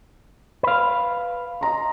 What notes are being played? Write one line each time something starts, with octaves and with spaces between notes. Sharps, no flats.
B4 F5
D#5 A#5 C6